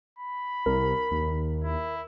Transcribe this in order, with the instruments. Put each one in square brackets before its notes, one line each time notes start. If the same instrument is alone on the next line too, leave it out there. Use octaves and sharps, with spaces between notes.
[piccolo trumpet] B5
[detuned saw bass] C2 [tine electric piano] A#4
[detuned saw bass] D#2
[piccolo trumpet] E4